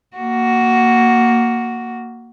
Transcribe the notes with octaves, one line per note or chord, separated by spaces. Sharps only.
A#3 F#4